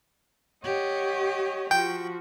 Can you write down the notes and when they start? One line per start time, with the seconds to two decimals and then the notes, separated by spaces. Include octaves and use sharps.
0.64 G4 C#5 D#5 F#5
1.71 F3 F#4 G5